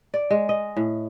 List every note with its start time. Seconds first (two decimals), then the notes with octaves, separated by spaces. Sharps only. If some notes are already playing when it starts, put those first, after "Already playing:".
0.14 D5
0.31 G#3
0.49 D#5
0.77 A2